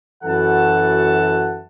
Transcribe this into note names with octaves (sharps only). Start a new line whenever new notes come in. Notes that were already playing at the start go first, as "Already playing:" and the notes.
F#2 E3 F#4 A4 F#5 A5